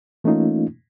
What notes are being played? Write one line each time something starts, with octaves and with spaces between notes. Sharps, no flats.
E3 A3 A#3 C#4 D#4 F4